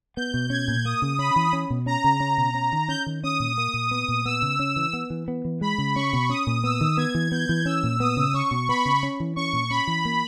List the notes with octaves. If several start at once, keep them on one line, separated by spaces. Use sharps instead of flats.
B3 G6
B2
C#4 G#6
A#2
A#3 D#6
C#3
C#4 B5
E3
C#4
B2
C#4 A#5
C#3
C#4 A#5
B2
C#4
D#3
C#4 G6
D#3
C#4 D#6
A#2
A#3 D#6
A#2
B3 D#6
A#2
B3 E6
C#3
C#4
E3
B3
E3
B3
E3
G#3 B5
C#3
C#4 C#6
B2
C#4 D#6
A#2
B3 E6
D#3
B3 G#6
E3
B3 G6
E3
C#4 E6
A#2
B3 D#6
C#3
C#4 C#6
B2
B3 B5
C#3
C#4
E3
C#4 C#6
A#2
C#4 B5
E3
A#3